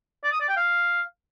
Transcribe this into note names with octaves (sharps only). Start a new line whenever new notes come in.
D5
D#6
D5
G5
F5